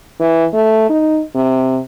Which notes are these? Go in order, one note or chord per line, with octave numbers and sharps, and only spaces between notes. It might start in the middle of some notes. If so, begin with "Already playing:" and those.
E3
A3
D#4
C3